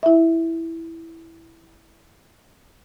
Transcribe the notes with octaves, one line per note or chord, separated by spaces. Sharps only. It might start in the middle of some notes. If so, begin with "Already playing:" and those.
E4 E5